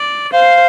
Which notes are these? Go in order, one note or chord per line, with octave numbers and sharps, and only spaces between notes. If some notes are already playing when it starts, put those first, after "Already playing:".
Already playing: D5
C5 F5